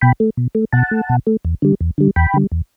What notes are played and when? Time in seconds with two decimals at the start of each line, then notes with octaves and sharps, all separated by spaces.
0.01 B2 G5 B5
0.20 A3
0.37 B2
0.55 A3
0.73 B2 F#5 A5
0.91 A3
1.09 B2
1.27 A3
1.45 E2
1.62 D3 G3
1.81 E2
1.98 D3 G3
2.16 E2 G5 B5
2.34 D3 G3
2.52 E2